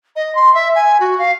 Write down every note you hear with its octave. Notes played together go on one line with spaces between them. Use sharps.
D#5
C6
E5
G#5
F#4
F5